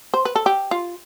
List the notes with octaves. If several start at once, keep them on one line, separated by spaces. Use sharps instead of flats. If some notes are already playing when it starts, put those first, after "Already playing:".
C5
B4
A4
G4
F4